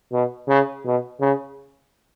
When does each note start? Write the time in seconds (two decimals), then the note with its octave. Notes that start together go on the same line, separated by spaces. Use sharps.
0.12 B2
0.48 C#3
0.85 B2
1.20 C#3